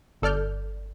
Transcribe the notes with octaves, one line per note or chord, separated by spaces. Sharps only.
G1 A4 D5 F6 G6